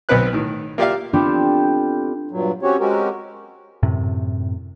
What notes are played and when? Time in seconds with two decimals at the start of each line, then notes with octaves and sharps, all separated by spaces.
0.09 B1 B3 C4 B4 F#6
0.33 A2 D#3
0.78 A#3 F4 G4 D5 E5 F5
1.13 B3 C4 D4 F4 G4 A4
2.31 G2 A#2 F#3
2.62 C4 C#4 F#4 G4 C#5
2.80 G#3 C4 C#4 F#4 G4 A#4
3.83 F#2 A2 C3